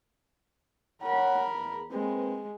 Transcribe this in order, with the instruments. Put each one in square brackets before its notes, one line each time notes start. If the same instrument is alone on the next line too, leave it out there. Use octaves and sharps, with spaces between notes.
[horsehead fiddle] A#4 B5 [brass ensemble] C#5 F#5
[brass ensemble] E2
[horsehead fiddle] G#3 [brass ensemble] A#3 C4 B4